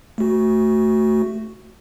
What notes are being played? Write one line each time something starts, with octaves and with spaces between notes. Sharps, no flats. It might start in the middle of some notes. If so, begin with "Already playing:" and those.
A3 F#4